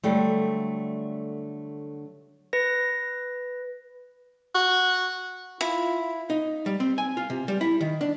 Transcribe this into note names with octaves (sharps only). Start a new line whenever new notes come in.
D3 F#3 G3 A3
B4 A#6
F#4
E4 F4
D#4
G3
C4
G#5
F4
C3
G3
E4
D#3
D4